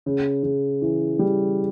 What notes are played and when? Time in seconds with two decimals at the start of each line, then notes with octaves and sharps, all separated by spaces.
0.06 C#3
0.43 C#3
0.82 E3
1.19 G3